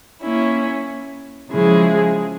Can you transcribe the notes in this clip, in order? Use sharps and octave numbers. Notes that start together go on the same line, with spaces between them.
A#3 C#4 E4
C#3 F3 G#3 E4 G#4